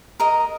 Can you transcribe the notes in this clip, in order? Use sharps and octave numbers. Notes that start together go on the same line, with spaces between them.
A#4 D#5